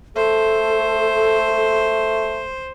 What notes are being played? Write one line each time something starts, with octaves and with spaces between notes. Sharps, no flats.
A3 A4 C5